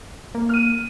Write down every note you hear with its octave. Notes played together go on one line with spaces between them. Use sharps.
A#3
F6 D#7